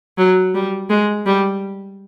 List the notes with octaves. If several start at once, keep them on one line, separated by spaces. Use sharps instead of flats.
F#3
G3
G#3
G3